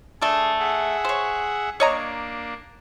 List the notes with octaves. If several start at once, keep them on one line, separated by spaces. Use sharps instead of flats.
A3 D4 G#4
G#4 E5 F#5
C5 C#5
A#3 D4 C#5 D#5 A#5